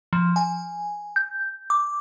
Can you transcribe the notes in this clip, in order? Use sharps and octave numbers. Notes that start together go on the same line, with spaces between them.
F3
G#5
G6
D6